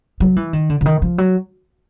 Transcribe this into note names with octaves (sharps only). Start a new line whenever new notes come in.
F#3
E3
D#3
D3
D3
D#3
F3
F#3